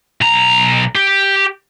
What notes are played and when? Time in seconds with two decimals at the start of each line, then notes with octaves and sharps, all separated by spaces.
0.21 B1 A#5
0.95 G4